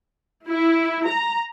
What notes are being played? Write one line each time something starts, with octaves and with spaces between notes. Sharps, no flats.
E4
A#5